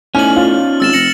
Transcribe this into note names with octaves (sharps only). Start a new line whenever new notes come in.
A2 C#4 D#4 G#5 F6 F#7
F4
G#1 E6 A6 E7
F1 A#6 C#7 F#7